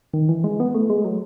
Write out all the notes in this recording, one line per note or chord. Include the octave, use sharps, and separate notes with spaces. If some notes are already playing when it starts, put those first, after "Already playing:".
D#3
E3
G#3
B3
A3
G#3
F#3